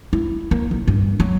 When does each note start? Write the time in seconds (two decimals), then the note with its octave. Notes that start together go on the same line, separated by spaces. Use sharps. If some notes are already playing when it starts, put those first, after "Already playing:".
0.13 E4
0.51 A#3
0.71 B1
0.88 G2
1.20 F#3